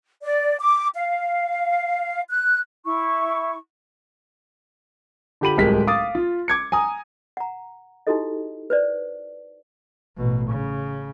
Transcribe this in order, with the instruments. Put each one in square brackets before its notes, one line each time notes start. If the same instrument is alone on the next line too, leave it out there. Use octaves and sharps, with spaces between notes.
[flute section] D5
D6
F5
F#6
E4 C#6
[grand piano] D3 F4 G4 B5 D#7 F#7
D1 C2 G#3 G4 A#4 B6
F5 D6 D#6 A6
F4
D6 G#6 C#7
G#5 A#5 D#6
[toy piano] F#5 A#5
D#4 E4 F#4 G4 A4 D#5
B4 C5 D5
[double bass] A1 B2
C#3